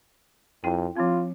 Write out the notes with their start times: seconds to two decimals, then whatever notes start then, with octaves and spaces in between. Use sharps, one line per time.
0.64 F2 E4 G5
0.96 F3 C4 F4